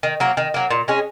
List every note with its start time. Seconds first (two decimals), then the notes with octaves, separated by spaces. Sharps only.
0.03 D#3
0.20 F#3 A#3
0.37 D#3
0.54 F#3 A#3
0.70 A#2
0.88 G#3 C#4 G#4